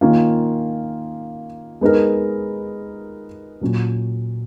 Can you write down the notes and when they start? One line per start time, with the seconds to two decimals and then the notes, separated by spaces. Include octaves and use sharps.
0.01 D#3 A#3 C#4 F4
1.81 G#3 B3 D#4 A#4
3.61 A#2 F#3 C#4